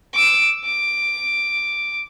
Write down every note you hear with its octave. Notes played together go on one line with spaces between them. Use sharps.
D6 E6
D6